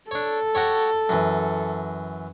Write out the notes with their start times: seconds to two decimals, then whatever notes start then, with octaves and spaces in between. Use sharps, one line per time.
0.11 D4 A4 C#5
0.55 F#4 G4 C#5
1.09 F#2 E3